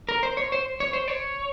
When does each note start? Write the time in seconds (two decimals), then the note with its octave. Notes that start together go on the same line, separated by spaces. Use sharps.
0.09 A#4
0.23 C5
0.37 C#5
0.52 C5
0.80 C#5
0.93 C5
1.08 C#5